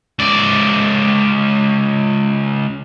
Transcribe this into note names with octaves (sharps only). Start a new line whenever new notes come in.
C#2 D5